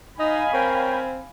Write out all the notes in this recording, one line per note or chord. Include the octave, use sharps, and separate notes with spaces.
D#4 D#5 F5 G#5 B5
C4 A#4 C#5 G5